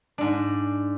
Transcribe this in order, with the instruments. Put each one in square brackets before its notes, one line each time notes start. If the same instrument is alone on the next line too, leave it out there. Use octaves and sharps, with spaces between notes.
[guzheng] G#2 D4